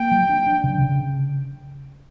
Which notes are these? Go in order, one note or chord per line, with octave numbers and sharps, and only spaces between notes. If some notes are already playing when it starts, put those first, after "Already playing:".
Already playing: A#3 G5
F#3
D4
D4
C#3
C#3